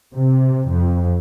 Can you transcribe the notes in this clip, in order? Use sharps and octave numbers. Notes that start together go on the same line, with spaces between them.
C3
F2